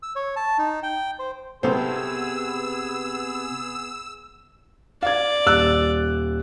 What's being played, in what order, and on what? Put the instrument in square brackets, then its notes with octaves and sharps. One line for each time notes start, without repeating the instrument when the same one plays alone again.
[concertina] E6
C#5
A5
D#4
G5
C5
[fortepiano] B1 A4 C5 [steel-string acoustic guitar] C3 G5 [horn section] B3 G#4 [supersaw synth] E6
[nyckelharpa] D5 [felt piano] F5 G#6
[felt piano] D#1 E6 F#6